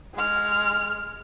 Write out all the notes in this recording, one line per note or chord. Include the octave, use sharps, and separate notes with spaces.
G#3 F6